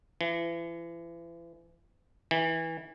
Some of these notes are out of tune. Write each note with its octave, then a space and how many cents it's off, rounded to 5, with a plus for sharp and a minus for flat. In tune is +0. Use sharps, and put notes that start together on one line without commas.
E3 +35
E3 -20